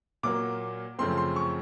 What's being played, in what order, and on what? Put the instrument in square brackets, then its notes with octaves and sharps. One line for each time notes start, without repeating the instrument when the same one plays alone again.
[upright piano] A#2 F#3 A#3 D6
F#2 C#3 F3 A3 C4 C6
C6
C#6